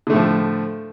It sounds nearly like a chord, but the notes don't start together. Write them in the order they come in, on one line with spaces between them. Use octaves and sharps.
D3 A3 A2 F3